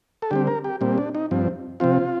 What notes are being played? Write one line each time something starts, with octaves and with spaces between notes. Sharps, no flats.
A4
D3 G3 C4 G4
A#4
G4
A#2 G3 C4
D4
D#4
G2 F3 C4
C3 F3 C4 F4